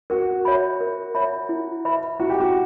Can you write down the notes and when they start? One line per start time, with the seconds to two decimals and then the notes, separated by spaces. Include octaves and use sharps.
0.10 F#4 A#4
0.45 C#5 E5 B5
0.81 A#4
1.15 C#5 E5 B5
1.49 E4
1.85 B4 E5 B5
2.20 E4 F#4
2.30 G4
2.40 F#4